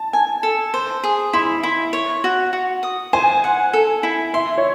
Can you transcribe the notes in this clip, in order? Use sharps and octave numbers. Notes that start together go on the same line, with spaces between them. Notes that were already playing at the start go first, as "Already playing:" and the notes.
Already playing: A5
G#5
A4
C5
G#4
E4 C6
E4
C#5
F#4
F#4
D#6
C5 G#5
F#5
A4
E4
E5 C6
C#5